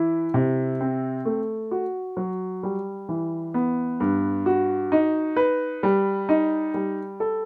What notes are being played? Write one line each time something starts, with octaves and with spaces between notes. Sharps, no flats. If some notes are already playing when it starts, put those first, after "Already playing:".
Already playing: E3 E4
C3
C4
A3
F#4
F#3
G3
E3
B3
G2
F#4
D#4
B4
G3
D#4
G3
A4